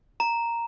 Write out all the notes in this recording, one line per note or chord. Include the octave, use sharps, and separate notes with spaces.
A#5